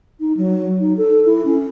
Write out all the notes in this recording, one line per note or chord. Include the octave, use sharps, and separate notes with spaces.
D#4
F#3
D#4
A4
E4
C#4